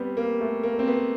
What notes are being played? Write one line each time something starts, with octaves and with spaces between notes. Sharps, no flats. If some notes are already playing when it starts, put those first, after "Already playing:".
Already playing: G3 B3 C4
A#3
A3
A#3
C4
B3